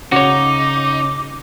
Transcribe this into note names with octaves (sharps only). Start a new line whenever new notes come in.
C#3 D#4 F#4 C#5 D6